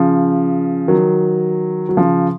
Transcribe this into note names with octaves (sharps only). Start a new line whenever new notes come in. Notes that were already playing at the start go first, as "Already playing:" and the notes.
Already playing: C#3 F3
D#3 F#3
F#3
C#3 F3